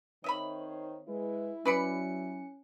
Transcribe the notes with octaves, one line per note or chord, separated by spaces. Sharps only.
D#3 C4 C5 C#5 D#5 E5 B5
G#3 E4 B4
F#3 C#4 B4 D5 B5 C#7